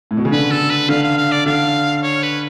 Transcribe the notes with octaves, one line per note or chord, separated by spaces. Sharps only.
A2
B2
C#3
D3 B4
A4
B4
D3 F5
F5
F5
D5
D3 F5
C#5
B4